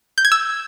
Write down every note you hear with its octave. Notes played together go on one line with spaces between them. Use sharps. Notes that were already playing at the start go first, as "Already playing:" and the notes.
G6
G#6
E6